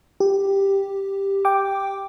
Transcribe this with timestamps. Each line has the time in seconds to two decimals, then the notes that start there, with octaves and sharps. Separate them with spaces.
0.20 G4
1.45 G5 D6